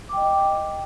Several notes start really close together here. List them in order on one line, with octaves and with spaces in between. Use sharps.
D6 G5 D#5